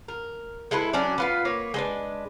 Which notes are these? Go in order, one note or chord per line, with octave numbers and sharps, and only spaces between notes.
A#4
G#3 E4 A4 B4
F#3 C#4 D4 D5
B3 F4 B4
A#3 B4 C#5
G#3 D4 B4